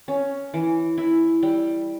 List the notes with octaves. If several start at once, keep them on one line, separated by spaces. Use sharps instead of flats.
C#4
E3
E4
G3